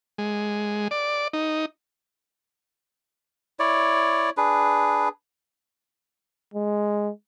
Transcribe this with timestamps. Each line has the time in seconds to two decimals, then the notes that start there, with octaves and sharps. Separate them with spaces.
0.18 G#3
0.91 D5
1.33 D#4
3.59 E4 C#5 D5
4.37 D4 G#4 B4
6.54 G#3